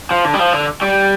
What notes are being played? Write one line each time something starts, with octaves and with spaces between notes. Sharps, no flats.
F3
D3
G3
F3
D3
G3